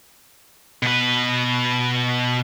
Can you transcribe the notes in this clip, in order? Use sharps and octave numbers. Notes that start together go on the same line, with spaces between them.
B2 B4